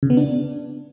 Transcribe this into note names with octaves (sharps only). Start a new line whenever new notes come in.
C#3
B3
D4